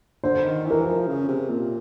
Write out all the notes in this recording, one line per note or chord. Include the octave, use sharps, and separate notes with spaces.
D3 C5
D#3
E3
A#4
F3
C#3
C3
A#2